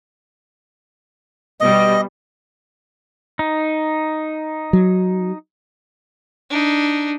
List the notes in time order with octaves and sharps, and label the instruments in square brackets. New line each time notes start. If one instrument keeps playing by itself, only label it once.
[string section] B2 G3 [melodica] D#5
[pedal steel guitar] D#4
[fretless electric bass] F#3
[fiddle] D4 D#4